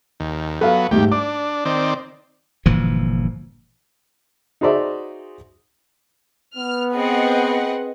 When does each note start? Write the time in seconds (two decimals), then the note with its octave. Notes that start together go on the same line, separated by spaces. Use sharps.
0.20 D#2
0.61 F#3 B3 A4 F5
0.91 D#2 G#2 G3 A3 G4
1.11 D4 D6
1.65 D#3 C4 D5
2.66 G1 A#2 E3 F3
4.61 D#4 F#4 G#4 C5 D5 E5
6.57 B3 F6
6.93 C4 G#4 B4 D#5 F#5